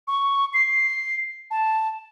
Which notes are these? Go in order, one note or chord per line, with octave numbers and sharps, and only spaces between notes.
C#6
C7
A5